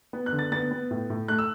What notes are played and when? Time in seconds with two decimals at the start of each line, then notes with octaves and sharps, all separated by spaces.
0.13 B3
0.26 F#6
0.33 D3
0.39 A6
0.52 B3 A6
0.71 B3
0.91 A2
1.10 A2
1.28 A3 F#6
1.39 E6